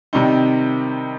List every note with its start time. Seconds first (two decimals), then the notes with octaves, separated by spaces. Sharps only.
0.13 C3 D#3 G3 C4 D#4